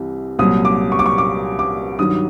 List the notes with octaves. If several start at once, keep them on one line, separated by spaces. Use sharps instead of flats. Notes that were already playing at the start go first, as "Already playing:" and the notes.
Already playing: C2 C3 E3
C2 A#2 F#3 D#6
D6
C#6
D6
C#6
D6
D6
G2 D#3 F#3 D#6